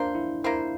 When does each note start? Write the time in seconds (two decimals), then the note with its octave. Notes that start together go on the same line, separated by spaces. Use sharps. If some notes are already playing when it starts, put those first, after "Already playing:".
Already playing: A#3 D4 F4 C5
0.15 E4
0.44 A#3 E4 F4 C5